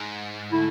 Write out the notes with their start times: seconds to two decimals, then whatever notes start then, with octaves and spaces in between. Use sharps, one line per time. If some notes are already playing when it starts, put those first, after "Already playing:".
Already playing: G#2
0.50 D3 A3 E4